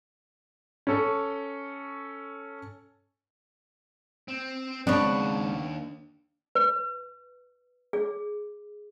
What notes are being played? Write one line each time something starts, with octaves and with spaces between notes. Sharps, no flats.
C#4 A4
C4
D#2 C#3 G#3 B3 C4 D4 C#5 A5
B4
G#4